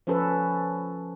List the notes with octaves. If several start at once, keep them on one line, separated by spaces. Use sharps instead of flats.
F3 C#4 A4 B4